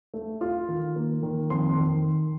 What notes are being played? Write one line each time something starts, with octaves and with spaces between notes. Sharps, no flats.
A3
F4
D#3
A#3
D#3
F2 C6
D#3